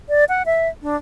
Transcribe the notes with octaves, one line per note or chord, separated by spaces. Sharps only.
D5
F#5
E5
D4